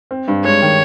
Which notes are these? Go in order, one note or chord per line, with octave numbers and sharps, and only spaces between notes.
C4
G2
G#3 C#5
D#3